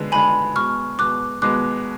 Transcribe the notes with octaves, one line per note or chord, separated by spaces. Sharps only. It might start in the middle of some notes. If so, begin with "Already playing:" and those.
Already playing: D3 G#3 B3
D3 G#3 B3 G#5 B5
B2 G#3 B3 C#6 F6
B2 G#3 B3 D6 F#6
B2 G#3 B3 D6 F#6